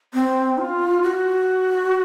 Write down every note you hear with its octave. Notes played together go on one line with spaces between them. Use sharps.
C4
F4
F#4